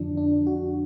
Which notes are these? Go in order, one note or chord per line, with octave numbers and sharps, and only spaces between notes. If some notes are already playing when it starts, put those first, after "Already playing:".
Already playing: F2 D3 F3 D4
D4
F#4